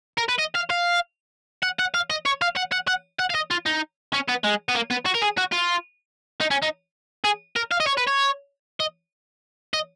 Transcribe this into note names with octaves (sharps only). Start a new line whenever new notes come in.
A#4
B4
D#5
F5
F5
F#5
F#5
F5
D#5
C#5
F5
F#5
F#5
F#5
F#5
F5
D#5
F4
D#4
C#4
B3
G#3
B3
A#3
B3
F#4
A#4
G#4
F#4
F4
D#4
C#4
D#4
G#4
A#4
F5
D#5
C#5
B4
C#5
D#5
D#5